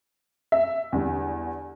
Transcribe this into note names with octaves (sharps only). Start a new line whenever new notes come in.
E5
E2 D3 G3